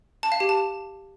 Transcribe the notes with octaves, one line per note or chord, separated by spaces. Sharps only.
A5
F5
G4
A5